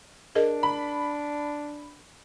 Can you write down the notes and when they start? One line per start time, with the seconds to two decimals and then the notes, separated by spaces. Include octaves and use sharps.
0.35 D4 G#4 A#4 D#5
0.63 B5